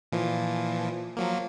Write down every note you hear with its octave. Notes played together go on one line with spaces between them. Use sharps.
A#2 E3 F3
F3 F#3 A#3